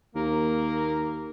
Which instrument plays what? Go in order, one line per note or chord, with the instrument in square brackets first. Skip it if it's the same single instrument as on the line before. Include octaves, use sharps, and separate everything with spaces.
[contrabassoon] D#2 [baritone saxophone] A#3